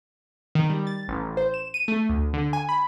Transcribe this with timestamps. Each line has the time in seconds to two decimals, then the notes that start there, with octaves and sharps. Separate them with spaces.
0.55 D#3
0.70 G3
0.87 A6
1.08 A1
1.37 C5
1.54 E7
1.74 D#7
1.88 A3
2.09 D2
2.33 D3
2.53 G#5
2.69 B5